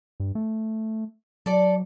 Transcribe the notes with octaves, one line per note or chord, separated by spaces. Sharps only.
G2
A3
F#3 A4 D5